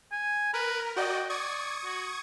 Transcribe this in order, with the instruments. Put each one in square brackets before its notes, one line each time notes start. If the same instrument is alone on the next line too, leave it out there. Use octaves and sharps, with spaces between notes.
[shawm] G#5
[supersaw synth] A#4 [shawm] B4
[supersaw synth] F#4 D5 D#5 [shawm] G5
[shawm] D5 [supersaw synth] C#6 D#6 G#6
[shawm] F#4